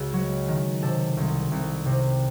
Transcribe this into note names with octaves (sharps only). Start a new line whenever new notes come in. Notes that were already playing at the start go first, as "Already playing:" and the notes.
Already playing: C#2 F#4 G#4
F#3
D#3
C3 A4
C2
C2
C3